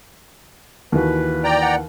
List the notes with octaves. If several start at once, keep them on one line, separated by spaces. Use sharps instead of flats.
D#2 E3 F#4 B4
D5 G5 A#5
F#5